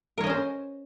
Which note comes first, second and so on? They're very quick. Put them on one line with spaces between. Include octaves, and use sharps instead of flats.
A#4 C#5 D#5 C#4 C5